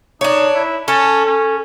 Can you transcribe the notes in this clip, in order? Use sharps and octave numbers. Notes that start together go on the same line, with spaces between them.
D4 D#4 C#5
E4
C#4 A4
C#4